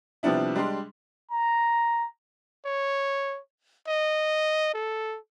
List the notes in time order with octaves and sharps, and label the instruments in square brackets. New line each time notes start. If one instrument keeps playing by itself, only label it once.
[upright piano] C3 F3 G3 B3 D4 E4
G3 G#3 D4 C6
[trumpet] A#5
C#5
D#5
A4